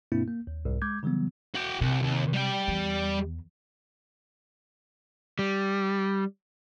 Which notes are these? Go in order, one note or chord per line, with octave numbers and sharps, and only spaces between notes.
G2 B2 A#3 C4 D4 E4
A#3
D#2
C2 G#2
G#3 D6 G6 G#6
C#3 E3 F#3 G3 B3
F#4 G5
C2 C3
D#2
G3 G5
E2
G3